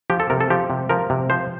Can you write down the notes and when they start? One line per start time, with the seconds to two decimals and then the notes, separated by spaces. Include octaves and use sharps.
0.10 F3 G4
0.20 A4
0.30 C3 A#4
0.40 A4
0.50 F3 G4
0.70 C3
0.89 F3 A#4
1.10 C3
1.30 F3 C5